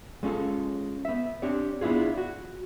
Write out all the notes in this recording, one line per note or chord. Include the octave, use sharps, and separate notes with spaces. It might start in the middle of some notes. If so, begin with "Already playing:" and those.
G#3 C#4 F4 A4
B3 E5
C4 D4 G4 C#5
B3 D4 E4 F4 G#4
F#4